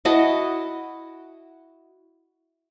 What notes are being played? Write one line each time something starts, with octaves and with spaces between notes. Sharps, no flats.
E4 F#4 D#5 A5